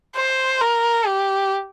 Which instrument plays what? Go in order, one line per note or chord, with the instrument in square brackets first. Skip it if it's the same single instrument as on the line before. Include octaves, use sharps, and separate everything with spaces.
[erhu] C5
A#4
G4